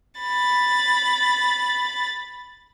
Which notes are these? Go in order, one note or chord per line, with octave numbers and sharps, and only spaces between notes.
B5 A6